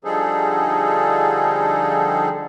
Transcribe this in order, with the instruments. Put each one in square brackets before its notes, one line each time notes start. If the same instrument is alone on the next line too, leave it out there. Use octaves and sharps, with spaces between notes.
[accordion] D3 F3 G3 D#4 G#4 A4